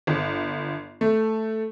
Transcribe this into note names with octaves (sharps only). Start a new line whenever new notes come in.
G1
A3